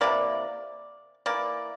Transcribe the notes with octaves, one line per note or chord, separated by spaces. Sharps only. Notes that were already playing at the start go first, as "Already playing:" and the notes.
C3 E3 A#3 D5
E3 A#3 D5